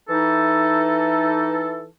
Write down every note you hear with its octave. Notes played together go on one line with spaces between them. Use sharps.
E3 D#4 A4